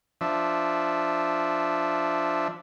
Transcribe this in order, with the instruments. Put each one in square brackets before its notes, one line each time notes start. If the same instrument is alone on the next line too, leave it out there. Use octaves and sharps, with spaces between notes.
[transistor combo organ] F3 D4 E5